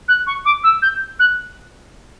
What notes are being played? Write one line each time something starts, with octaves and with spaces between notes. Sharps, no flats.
F#6
C#6
D6
E6
G6
F#6